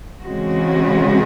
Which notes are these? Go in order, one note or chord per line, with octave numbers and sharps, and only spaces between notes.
C#3 E3 G#3 C4 F#4